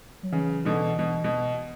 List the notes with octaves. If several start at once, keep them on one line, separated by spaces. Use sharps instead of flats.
F#3
C#3 E3
B2 D3
B2
B2